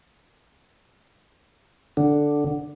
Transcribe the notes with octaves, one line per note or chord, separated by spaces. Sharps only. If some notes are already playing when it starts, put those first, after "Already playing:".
D3